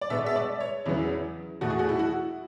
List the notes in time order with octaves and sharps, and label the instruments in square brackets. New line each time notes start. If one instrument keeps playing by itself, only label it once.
[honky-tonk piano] D5
B2 G#3 B3 E5
E5
D5
C#5
E2 C#3 F#3 B3 E4
E2 B2 A3 F#4
G#4
F#4
E4
F#4